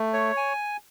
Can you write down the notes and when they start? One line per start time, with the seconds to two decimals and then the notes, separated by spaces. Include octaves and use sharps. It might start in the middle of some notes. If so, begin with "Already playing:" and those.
Already playing: A3
0.13 C#5
0.37 G#5